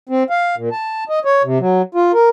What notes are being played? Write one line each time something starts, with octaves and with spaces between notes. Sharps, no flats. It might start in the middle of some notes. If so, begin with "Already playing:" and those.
C4
F5
A#2
A5
D#5
C#5
C3
F#3
F4
A#4